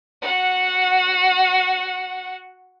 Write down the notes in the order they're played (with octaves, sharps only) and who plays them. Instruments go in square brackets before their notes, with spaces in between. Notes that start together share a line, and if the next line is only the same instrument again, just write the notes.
[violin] F#4 F#5